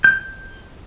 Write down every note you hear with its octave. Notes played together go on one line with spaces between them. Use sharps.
G6